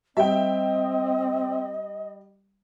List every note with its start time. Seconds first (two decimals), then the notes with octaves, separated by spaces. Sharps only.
0.17 G3 C4 G4 D#5 E5 G5